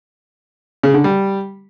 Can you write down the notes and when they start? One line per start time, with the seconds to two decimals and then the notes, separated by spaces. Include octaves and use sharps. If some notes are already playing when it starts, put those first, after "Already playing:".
0.83 C#3
0.94 D3
1.04 G3